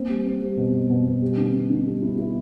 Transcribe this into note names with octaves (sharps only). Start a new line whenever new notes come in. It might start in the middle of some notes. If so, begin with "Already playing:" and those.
Already playing: A#3 C4
G3
C4
G3
B2
B2
B2
B2
G3
D3
D3
D3
G3
E4
E4